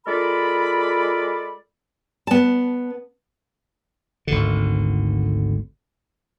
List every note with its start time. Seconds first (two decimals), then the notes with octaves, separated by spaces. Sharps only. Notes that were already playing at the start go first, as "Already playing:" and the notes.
0.06 G#3 F4 A4 A#4 D5 B5
2.27 B3 A5
4.27 G#1 D2 D3